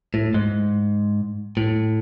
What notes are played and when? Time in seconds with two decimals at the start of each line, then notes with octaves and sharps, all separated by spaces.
0.14 A2
0.34 G#2
1.57 A2